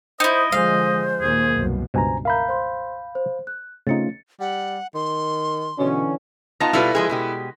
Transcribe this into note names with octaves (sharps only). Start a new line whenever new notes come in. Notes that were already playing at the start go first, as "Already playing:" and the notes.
D#4 E4 C5 D#5
D3 F3 G#3 C5 F5
D#2 A#2 A#3 G#4
C2 F#2 B2
C#2 G2 B2 C5 G#5 A#5
A#4 E5 F5 A#5 B5 G6
C5 C6
C5
F#6
C#3 A3 C4 C#4 D#4 F4 A6 C#7
G3 F#5
D#3 C6
B2 D3 E3 C#4
B3 D#4 F4 A5 A#6
B2 G3 E4 F4 A4 B4
F3 G#3 G#4
B2 G#3 G4